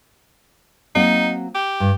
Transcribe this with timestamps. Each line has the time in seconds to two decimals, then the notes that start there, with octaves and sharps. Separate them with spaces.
0.95 F#3 A#3 C4 D#4
1.55 G4
1.80 G2